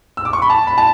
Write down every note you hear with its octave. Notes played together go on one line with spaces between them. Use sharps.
E6
D6
C#6
B5
A5
B5
A5